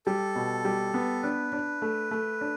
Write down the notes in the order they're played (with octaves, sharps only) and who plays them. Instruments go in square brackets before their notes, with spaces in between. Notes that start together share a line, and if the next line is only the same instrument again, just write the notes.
[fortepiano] G3 [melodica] A4
[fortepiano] B2
G3
B3
[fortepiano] D4 [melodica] B4
[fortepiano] D4
A3
A3
D4